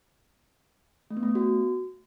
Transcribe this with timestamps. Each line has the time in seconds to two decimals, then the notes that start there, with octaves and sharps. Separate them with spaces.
1.10 A3
1.17 B3
1.23 A3
1.29 B3
1.35 F#4